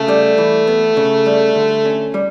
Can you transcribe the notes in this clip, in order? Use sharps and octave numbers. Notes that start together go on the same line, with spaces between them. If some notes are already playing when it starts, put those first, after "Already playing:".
Already playing: C#3 A3
G3
E3
B3
C#3
G3
D3
C#4
G3